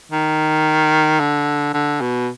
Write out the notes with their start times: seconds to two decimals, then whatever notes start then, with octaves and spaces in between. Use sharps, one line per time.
0.12 D#3
1.20 D3
1.74 D3
2.01 B2